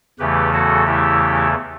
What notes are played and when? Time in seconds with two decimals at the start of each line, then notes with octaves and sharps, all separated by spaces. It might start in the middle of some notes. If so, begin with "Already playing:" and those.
0.19 E2 C#3 E3 A3 G4 B4
0.53 F#4 A4
0.87 E4 G4